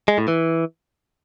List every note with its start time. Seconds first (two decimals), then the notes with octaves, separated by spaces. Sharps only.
0.08 G#3
0.18 A2
0.28 E3